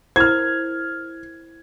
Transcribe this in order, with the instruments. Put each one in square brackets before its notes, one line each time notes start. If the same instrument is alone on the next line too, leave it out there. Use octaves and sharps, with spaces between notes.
[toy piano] E4 A#4 C5 [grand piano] F6 G#6